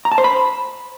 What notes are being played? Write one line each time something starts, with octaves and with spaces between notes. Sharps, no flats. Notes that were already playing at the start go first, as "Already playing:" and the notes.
A#5
A5
C5
B5